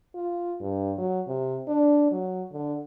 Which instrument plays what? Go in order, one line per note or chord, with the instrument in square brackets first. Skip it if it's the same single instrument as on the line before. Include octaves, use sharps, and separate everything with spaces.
[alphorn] F4
G2
F#3
C3
D4
F#3
D3